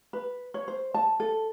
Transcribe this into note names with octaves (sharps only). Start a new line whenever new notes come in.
B4
C#5
C5
A5
A4